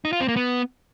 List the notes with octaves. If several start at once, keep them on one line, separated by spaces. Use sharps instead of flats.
D#4
F4
C4
A#3
B3